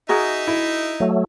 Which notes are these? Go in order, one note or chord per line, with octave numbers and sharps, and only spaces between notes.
D#4 F#4 G#4 A#4 E5
E4
F#3 A3